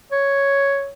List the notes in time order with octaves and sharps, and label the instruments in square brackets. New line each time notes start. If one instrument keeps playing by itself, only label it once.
[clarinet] C#5